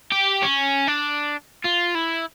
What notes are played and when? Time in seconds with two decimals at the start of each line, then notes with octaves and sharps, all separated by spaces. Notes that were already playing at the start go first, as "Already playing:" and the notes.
0.12 G4
0.43 C#4
0.88 D4
1.64 F4
1.95 E4